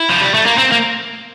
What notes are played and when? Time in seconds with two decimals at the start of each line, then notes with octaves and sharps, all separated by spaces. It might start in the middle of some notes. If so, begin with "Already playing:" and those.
Already playing: E4
0.10 F3
0.21 G3
0.34 A3
0.46 A#3
0.58 C4
0.72 A#3